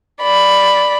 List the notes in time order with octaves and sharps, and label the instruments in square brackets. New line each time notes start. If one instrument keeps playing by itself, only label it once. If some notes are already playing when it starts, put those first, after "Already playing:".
[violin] D5 B5